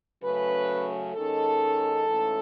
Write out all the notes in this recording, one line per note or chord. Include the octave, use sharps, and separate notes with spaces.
C#3 F#3 A3 C#4 B4
D#2 D#3 G#3 C#4 A4
G#2 E3 A3 C#4